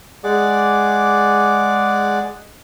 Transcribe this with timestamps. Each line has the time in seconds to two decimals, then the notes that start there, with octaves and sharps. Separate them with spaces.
0.24 G#3 G#4 D5 F#5 D6